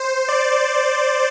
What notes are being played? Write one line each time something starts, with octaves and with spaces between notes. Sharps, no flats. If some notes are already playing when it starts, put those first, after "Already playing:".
Already playing: C5
D5